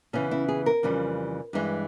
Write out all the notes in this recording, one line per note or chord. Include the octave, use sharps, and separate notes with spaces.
E2 C#3 E3 C#4
E4
G#4
A#4
F2 C#3 E3 G3
G2 E3 G#3